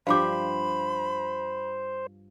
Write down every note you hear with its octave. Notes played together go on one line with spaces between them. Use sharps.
G2 F3 G4 C5 F5 B5 D6